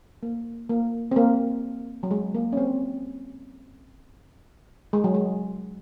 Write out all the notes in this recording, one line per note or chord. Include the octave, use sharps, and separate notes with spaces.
A#3
A#3
C4
A#3
F#3
G#3
A#3
C#4
C4
G#3
F#3
G#3